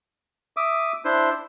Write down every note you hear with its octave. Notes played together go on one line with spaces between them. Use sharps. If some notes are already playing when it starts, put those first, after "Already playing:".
E5 D6 D#6
D4 E4 C5